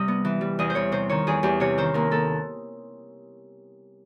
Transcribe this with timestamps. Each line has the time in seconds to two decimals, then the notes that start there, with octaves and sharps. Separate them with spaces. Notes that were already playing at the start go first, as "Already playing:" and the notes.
Already playing: C3 G3 D#5
0.08 B3
0.25 E3
0.41 G3
0.59 E2 D#5
0.70 C5
0.75 E2 C#5
0.92 C3 C5
1.10 D#3 C#5
1.27 E2 G#4
1.43 E2 G4
1.60 C3 C#5
1.78 D#3 C5
1.94 D#2 A#4
2.11 D#2 A4